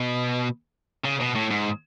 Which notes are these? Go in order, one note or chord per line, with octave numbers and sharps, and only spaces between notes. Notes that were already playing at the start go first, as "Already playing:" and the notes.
Already playing: B2
C#3
B2
A2
G#2